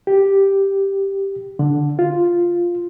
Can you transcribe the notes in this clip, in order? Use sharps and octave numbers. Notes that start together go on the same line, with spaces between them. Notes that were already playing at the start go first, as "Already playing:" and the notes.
G4
D3
F4